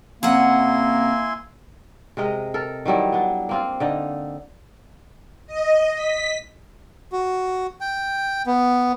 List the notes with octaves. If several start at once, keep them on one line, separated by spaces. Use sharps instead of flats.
C3 A#3 C#4 E4 F#5 G#5 C6
C3 G#3 A#4 D#5
A4 A#4
D#3 F#3 G3 E4
B3 D4
A#3 C4 F4
D3 D#4 D#5
D#5
B6
F#4
G5
B3